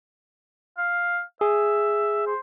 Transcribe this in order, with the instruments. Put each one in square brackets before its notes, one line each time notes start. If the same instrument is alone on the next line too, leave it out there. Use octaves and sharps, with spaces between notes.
[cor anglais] F5
[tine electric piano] G#4 [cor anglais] E5
[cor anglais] C5